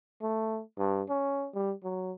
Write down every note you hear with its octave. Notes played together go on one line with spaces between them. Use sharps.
A3
G2
C#4
G3
F#3